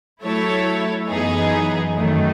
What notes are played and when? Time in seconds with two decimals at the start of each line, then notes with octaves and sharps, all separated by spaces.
0.21 F#3 A3 E4 A4 C#5
1.08 F#2 E3 B3 D#4 G#4
1.96 F#2 D#3 A3